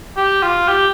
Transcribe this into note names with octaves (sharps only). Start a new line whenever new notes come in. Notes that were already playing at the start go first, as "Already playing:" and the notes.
G4
F4
G4